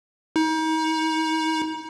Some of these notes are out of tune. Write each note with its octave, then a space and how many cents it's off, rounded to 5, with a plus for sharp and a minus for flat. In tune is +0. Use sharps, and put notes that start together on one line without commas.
D#4 +35